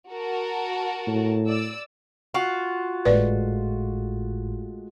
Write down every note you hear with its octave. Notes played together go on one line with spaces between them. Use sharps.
F#4 A#4 A5
A2
D5 E6
F4 F#4
G#1 A2 G#3 A3 B4 D5